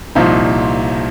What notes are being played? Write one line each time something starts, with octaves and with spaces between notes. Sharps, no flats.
C2 A#2 F3 C4 D#4